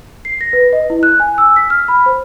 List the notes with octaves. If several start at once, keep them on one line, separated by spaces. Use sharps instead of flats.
C7
A#6
B4
D#5
E4
F#6
G#5
E6
B6
F6
B5
C5